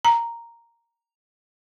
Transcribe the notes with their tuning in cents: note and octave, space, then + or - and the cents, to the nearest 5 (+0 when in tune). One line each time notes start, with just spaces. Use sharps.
A#5 +0